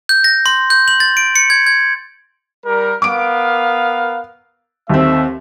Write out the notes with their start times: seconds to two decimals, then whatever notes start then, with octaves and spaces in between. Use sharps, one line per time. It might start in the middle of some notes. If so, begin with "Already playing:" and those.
0.09 G6
0.24 A#6
0.46 C6
0.70 G6
0.88 F#7
1.00 A6
1.17 D7
1.36 C#7
1.50 G#6
1.66 G#6
2.66 G3 A#4
3.02 B3 A#4 F5 D6 D7
4.90 D#2 A3 C4 E5